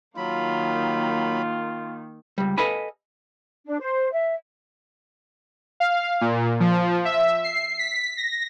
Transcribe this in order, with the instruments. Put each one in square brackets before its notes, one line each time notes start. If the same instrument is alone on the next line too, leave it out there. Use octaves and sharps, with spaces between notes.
[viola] D#3 A#3 [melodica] F#3 B5 [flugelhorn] F4
[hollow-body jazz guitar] C#2 G3
A4 B4 D#5 F5 G#5 B5
[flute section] D4
C5
E5
[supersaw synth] F5
A#2
F3
E5
C7
B6
A#6